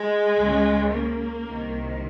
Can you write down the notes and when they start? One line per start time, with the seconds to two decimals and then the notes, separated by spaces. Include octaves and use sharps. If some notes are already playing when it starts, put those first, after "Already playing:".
Already playing: G#3
0.38 C#2 C#3
0.91 A#3
1.44 C2 C3 D#3